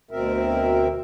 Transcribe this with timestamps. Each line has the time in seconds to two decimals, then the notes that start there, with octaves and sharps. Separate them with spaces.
0.11 D2 B2 C4 A#4 E5